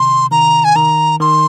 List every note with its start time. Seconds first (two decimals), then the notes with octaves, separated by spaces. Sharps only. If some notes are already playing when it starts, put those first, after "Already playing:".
Already playing: C3 D#3 C6
0.31 D#3 A#5
0.64 G#5
0.76 D#3 A#5
1.20 D#3 C6